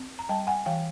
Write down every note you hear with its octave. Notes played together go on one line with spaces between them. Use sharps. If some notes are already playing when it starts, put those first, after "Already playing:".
Already playing: C4
A#5
G3 G5 A5
F#5 G#5
E3 F5 G5